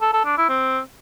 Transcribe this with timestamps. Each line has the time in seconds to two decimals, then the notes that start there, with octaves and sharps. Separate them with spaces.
0.02 A4
0.13 A4
0.25 D4
0.37 E4
0.49 C4